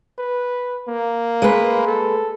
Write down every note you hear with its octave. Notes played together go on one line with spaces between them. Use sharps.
B4
A#3
G#3 B4
A4